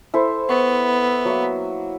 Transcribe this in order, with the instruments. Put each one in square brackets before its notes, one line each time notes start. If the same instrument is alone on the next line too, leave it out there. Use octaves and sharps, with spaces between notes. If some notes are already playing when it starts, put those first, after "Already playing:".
[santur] E4 A4 C5
[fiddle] B3 [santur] C#6
[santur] F#3 A#3 E5